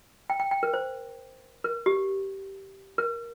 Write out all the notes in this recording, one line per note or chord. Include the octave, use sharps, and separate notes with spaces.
G5
G5
G5
A#4
C5
A#4
G4
A#4